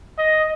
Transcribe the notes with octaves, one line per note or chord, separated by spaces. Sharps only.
D#5